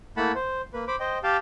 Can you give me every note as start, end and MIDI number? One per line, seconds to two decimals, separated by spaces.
0.17 0.32 57
0.17 0.32 58
0.17 0.32 64
0.17 0.32 78
0.17 0.32 81
0.17 0.32 83
0.35 0.61 72
0.73 0.85 58
0.73 0.85 71
0.88 0.96 72
0.88 0.96 83
0.88 0.96 86
1.00 1.18 72
1.00 1.18 75
1.00 1.18 79
1.23 1.37 67
1.23 1.37 77
1.23 1.37 79
1.23 1.37 81